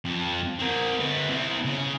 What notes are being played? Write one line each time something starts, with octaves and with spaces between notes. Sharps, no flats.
F2
C4 A#4
D3 B4
C4 E4
C#3